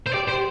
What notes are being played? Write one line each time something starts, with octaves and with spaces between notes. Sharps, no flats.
C5
G4 D5
G4 C5